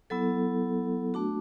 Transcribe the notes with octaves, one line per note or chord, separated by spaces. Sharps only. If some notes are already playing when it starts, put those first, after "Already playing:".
F#3 B3 E4 A4
A3 D4 F#4